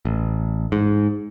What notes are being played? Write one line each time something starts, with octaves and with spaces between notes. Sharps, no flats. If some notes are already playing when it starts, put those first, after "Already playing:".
A1
G#2